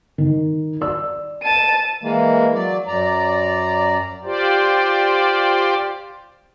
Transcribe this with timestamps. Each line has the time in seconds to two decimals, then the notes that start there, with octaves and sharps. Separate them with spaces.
0.18 D#3
0.81 D5 E6
1.43 A5 D#7
2.03 E3 G#3 A#3
2.55 F#3 D5
2.87 F#2 D5 A#5
4.23 F4 G4 C5 D5